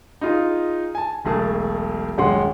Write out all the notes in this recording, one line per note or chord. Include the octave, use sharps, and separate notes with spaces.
D#4 F4 G#4
G#5 A5
E1 B1 A3 G#4 A#4 A5
D#1 F#2 G#3 F#5 C6